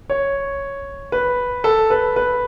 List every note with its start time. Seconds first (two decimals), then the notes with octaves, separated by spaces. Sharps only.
0.10 C#5
1.12 B4
1.64 A4
1.90 B4
2.16 B4